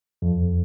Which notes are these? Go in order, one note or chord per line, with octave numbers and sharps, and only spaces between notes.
F2